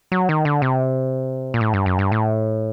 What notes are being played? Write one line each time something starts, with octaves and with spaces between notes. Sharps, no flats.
F#3
D#3
D3
C3
A#2
A2
G2
F#2
G2
A2